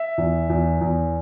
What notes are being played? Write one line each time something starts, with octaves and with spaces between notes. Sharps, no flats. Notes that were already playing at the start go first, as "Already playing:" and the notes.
Already playing: E5
E2
E2
E2